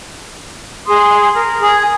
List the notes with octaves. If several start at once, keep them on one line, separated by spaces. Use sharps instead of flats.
G#4 C6 D#6
A#4
G#4